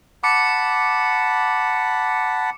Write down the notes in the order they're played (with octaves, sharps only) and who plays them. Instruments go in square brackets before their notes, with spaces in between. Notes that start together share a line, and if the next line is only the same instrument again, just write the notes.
[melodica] F#5 A5 B5 [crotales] D6 C#7